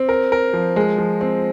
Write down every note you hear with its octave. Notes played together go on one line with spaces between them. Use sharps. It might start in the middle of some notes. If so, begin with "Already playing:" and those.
Already playing: C4
A#4
A#4
F3
G#3
F3
C4